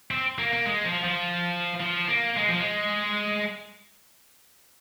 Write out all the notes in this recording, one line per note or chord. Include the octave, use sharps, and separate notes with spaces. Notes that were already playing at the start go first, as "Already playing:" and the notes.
C4
A#3
A#3
G#3
F3
F3
F3
A#3
G#3
F3
G#3